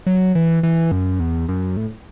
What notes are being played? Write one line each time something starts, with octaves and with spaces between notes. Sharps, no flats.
F#3
E3
E3
F#2
E2
F#2
A2